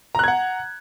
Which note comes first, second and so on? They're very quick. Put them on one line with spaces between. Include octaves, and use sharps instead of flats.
A#5 F#6 G#6 F#5